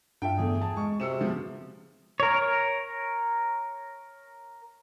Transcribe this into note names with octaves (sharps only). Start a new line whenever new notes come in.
G2 D4 F4 E5 G5
E2 E3 A3 G#4
A5
G#3 C#6
C3 F#4 G#4 E6 C#7 E7
F3 B3
A#4 C#5